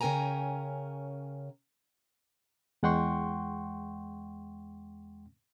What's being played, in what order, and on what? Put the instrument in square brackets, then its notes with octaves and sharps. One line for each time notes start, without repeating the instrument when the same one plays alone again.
[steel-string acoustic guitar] C#3 C#4 A#4 G5 G#5 A#5
[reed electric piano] E2 G#3 F#5 G5 C6 C#6